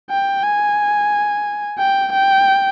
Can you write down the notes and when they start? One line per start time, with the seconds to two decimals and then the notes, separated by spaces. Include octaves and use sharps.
0.10 G5
0.44 G#5
1.79 G5
2.13 G5